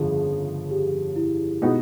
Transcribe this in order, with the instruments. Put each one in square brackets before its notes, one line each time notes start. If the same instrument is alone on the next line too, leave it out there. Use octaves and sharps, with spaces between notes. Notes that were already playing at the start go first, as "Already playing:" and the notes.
Already playing: [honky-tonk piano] G1 F2 C#3 F3 [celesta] G#4
[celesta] G4
E4
[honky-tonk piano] B2 G#3 B3 D#4 F#4